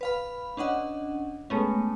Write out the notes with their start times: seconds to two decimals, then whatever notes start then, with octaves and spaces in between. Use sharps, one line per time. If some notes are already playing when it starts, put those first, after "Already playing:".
0.01 B4 F5 B5
0.57 C#4 D4 D#5 F#5
1.50 G#3 A3 B3 C#4